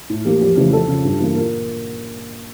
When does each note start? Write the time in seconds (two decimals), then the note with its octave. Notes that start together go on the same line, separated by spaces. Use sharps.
0.10 A2
0.25 E3 A#3 G4
0.41 F2 G4
0.57 C#3 E3 A3 G4
0.73 F2 A4
0.88 C#3 F3
1.05 G2
1.20 E3 A#3
1.36 A#2 A#4